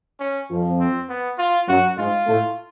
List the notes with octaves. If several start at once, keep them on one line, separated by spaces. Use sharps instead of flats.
C#4
F2 F3
C4
B3
F4
F#2 F#3 F#4
G#2 G#3 F4
A2 A3